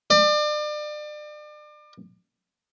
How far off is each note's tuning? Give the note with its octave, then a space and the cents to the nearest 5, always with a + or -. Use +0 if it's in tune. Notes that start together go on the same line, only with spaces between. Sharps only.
D5 +35